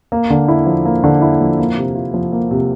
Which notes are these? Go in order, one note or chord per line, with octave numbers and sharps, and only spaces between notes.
A#3
D3
E4
F3
A#3
D3
E4
F3
A#3
C3
F4
F3
A#3
C3